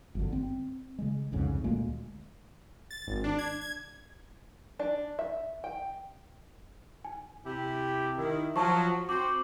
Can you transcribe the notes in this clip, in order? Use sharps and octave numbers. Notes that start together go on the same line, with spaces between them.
G1 F#2 D3
C4
C#3 G#3
C2 F2 G#2 C#3
D2 A#2 G#3 A#3
A6
G#1
D4
G#6
G#6
D4
E5
G5
G#5
C3 E4 G4
D#3 E4
F3 F#3 A5 C#6
C4 F#4 C5 D6